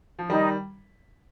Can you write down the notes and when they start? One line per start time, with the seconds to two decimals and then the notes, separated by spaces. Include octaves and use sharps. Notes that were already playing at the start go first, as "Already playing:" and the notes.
0.19 F3
0.29 D#3 G3 D#4